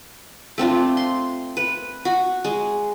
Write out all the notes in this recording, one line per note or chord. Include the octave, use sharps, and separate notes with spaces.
A3 C4 D4 F4
C6
B4
F#4
G#3